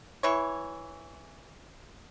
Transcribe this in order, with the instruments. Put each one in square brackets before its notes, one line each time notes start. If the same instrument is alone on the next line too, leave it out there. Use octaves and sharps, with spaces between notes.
[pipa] E3 C#5